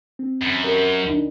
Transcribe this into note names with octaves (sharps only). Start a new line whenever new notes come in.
C4
F#2 B5
G4 A#4 D#5
D2 D4 D#4